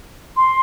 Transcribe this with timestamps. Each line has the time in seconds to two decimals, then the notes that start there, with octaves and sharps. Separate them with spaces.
0.37 C6